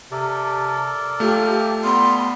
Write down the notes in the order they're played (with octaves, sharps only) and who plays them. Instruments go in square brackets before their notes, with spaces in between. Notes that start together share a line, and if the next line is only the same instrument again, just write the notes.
[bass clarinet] C3 [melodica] A4 A#4 D5
[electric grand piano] A3 [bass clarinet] F4 [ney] G4
[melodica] G3 [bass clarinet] B3 [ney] C6